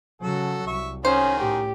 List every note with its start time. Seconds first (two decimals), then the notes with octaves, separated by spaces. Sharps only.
0.22 C#3 F#3 F#4 A4
0.67 C2 E5 C#6
1.05 D#3 C#4 F#4 G#4 C5
1.39 A2 G4